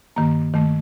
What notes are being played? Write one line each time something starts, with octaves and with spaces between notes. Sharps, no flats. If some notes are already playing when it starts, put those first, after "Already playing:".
G2 D#3 A#3 A#5
G2 D#3 A3